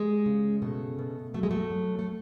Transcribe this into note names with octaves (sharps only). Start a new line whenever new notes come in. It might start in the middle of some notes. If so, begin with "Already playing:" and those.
Already playing: G3 G#3
C#3
B2 A3
B2
F#3 A3
G#3
A3
F#3
A3